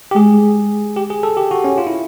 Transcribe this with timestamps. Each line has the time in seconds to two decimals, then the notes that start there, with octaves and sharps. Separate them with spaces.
0.11 G4
0.16 G#3 G#4
0.97 G4
1.10 G#4
1.23 A4
1.37 G4
1.51 F#4
1.64 C#4
1.78 F4
1.87 E4